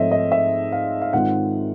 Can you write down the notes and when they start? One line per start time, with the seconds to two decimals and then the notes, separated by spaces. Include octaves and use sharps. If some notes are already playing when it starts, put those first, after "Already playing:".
Already playing: G#2 F3 A3 C4 C#5 D#5 E5
0.11 D#5
0.32 E5
0.72 F5
1.02 F5
1.13 G#2 D#3 G#3 C4 F4 F#5